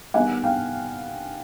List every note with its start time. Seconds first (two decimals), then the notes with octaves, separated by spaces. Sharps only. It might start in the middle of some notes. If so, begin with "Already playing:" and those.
0.14 D#3 G3 B3 F#5 G#5
0.44 F5 G5